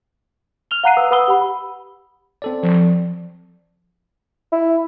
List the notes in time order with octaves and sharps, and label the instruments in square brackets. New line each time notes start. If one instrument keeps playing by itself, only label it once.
[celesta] F6 F7 G7
F5 F#5 A#5 F#6 C7 D#7
B4 D#6 E6
B4 F#5 B5 D#6 E6 G7
G4 F#5 B5
[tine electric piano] C4 A4 D5
[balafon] F3
[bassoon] E4